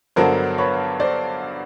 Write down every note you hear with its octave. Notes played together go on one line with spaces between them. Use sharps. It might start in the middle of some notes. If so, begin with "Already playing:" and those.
G2 D3 F#3 B3 D4 A#4 C5
B4 C#5
C5 D5